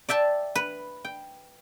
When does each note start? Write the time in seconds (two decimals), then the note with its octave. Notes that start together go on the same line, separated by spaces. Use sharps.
0.09 D5 E5 G5 A5
0.55 B4
1.05 G5